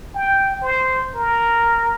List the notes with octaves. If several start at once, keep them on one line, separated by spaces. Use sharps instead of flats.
G5
C5
A#4